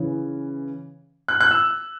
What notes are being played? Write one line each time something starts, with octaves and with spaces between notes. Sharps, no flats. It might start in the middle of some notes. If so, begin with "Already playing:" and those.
Already playing: C#3 E3 C#4
F#6
F#6
E6